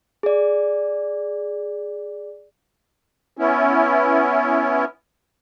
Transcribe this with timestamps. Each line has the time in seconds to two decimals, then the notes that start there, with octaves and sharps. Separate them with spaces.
0.23 G#4 D5
3.37 B3 C#4 E4